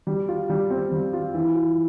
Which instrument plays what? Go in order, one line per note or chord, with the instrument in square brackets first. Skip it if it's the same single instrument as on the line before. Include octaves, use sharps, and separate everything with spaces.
[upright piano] G3
F4
G3
C4
G3
F4
E3
F4